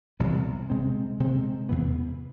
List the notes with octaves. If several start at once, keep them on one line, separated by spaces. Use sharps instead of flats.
C2 C3 E3 B3
C3 G#3 C4
C3 G#3 C4
E2 C3 E3 B3